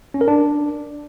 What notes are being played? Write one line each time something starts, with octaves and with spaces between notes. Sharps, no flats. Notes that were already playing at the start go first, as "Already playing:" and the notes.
C#4
A#4
D4